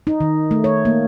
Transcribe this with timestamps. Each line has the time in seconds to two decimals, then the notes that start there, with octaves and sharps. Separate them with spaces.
0.07 D#4
0.20 D#3
0.51 A3
0.64 C#5
0.85 A#3